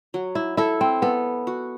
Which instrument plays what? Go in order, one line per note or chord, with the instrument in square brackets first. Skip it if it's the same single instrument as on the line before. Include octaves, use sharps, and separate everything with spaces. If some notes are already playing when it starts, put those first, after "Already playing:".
[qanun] F#3
[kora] E4
[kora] E4 [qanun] A4
[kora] C4
[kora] B3 [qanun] A4
[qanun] F#4